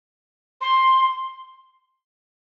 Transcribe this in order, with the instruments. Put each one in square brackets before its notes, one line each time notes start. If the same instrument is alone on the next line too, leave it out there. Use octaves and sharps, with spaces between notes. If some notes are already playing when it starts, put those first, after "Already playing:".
[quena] C6